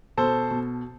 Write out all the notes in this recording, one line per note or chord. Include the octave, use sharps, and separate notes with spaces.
B2 A4 C5
B2